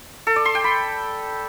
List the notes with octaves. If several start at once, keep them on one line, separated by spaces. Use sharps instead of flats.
A4
D5
C6
G5
B5